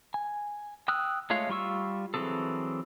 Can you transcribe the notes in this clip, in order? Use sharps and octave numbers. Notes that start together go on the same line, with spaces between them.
G#5
G5 D#6 E6 F#6
G#3 A3 F4 C#5 F5
G3 F4 C#6 E6
E3 F#3 C4 G#4 A4